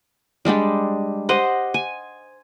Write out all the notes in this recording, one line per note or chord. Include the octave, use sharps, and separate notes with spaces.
G3 G#3 D4 G4
G4 C5 D#5 F#5
G#5